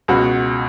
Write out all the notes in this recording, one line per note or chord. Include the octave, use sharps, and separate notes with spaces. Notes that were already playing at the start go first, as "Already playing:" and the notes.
C#2 B2 F#4